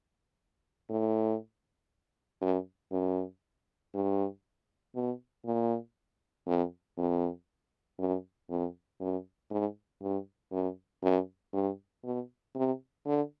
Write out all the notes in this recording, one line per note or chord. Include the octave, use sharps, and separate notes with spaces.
A2
F#2
F#2
G2
B2
A#2
F2
F2
F#2
F2
F#2
G#2
G2
F#2
F#2
G2
B2
C3
D3